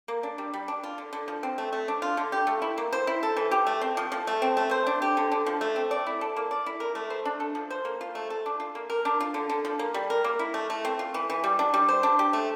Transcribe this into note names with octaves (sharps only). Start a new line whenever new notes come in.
A#3
D4
G3
G3
D4
F4
D3
D3
F3
C4
A3
A3
D4
F4
D3
G4
A3
E4
A#3
C5
E4
A4
E3
G4
A3
C4
F3
F3
A3
C4
A3
C5
D4
G4
D3
D3
F3
A3
C4
D5
E4
A4
A#3
D5
E4
A#4
A3
C5
D4
A4
F3
C5
A#3
F4
A3
A4
D4
F4
A#3
A#4
D4
F4
D3
D3
F3
A#3
G3
A#4
A#3
E4
A3
A3
C4
F4
E3
E3
G3
D4
G3
C5
D4
G4
A3